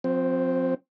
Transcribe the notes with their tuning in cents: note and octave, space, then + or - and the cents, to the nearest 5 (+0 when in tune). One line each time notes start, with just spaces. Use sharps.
F3 +40 C4 +0